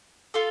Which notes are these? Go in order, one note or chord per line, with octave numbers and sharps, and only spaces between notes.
F4 A4